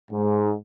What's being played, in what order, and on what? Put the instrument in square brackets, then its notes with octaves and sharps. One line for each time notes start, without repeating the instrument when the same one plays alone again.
[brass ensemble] G#2